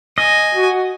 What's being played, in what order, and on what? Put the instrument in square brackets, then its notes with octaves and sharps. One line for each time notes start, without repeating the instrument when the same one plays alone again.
[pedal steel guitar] D#5 [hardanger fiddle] G#5
[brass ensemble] F#4